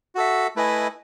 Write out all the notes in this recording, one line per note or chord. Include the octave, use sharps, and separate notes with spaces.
F#4 A4 E5
A3 E4 B4 D#5 G#5